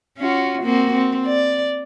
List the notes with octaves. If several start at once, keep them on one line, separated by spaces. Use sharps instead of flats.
C#4 F4 F#4
A#3 C4 F#4
C4
D5